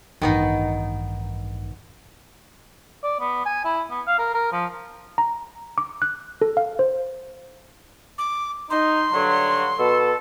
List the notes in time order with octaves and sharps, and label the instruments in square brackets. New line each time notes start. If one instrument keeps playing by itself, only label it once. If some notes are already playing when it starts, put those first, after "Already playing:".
[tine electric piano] A1 G2 [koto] D#3 B3 D#4
[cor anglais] D5
B3
G#5
E4
B3
F5
A#4
A#4
F3
[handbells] A#5
D6
F#6
A4
F5
C5
[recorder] D6
[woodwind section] D#4 [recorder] C6
[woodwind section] G2 D3 F#3
B2 A4